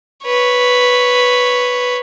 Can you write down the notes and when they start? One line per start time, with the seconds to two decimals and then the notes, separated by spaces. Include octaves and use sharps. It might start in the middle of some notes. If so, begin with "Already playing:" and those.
0.24 B4 C#5